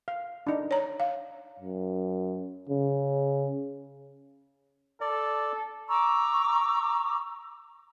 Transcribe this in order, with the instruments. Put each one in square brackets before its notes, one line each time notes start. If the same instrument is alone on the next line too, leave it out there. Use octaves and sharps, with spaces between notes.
[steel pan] F5
D4 D#4
[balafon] C#5 A#5
F5
[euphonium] F#2
C#3
[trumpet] A4 [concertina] D5
[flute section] A#5 C#6 D6 E6